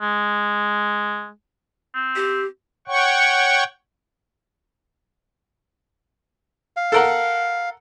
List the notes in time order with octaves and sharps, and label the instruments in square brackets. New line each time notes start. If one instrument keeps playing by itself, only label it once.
[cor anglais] G#3
[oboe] C4
[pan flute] G4
[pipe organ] C#5 F#5 G5 C#6
[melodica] F5
[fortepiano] A4 A#4 F#5